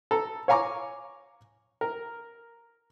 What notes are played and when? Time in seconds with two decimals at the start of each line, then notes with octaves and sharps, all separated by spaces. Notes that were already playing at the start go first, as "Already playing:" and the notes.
0.11 A4 A#5
0.48 C#5 F5 G#5 A#5 C#6 D6
1.81 A#4